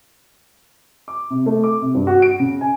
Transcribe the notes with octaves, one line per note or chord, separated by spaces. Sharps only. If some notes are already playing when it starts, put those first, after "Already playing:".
D6
C3
A3
D6
C3
G2
F#4
D7
C#3
G#5